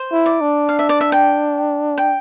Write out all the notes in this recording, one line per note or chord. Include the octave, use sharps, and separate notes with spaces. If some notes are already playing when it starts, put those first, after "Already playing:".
Already playing: C5
E4
D5
D4
F5
E5
D5
E5
G5
G5